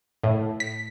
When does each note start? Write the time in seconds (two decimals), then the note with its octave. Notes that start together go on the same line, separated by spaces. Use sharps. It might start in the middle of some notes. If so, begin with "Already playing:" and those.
0.24 A2
0.60 B6